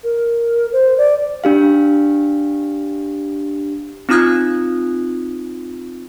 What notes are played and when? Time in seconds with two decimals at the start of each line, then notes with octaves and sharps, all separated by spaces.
0.04 A#4
0.73 C5
0.98 D5
1.44 D4 G4 F5
4.09 C4 D#4 F4 D#6 F#6 G#6